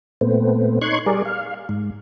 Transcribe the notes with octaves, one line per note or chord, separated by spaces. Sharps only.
A#2 A3 B3 C4
D#4 C#5 C6 C#6 F#6 G#6
G3 G#4 A#4 D5
F5
G#2